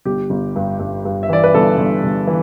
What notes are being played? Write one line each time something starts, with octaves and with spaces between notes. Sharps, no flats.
G1 G4
G1
G2
G2
G2
E5
E3 D5
B4
G1 A4
G1
G1
E3